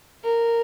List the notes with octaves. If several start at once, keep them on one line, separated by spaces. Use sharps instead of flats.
A#4